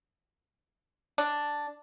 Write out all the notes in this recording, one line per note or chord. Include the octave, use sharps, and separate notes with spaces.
D4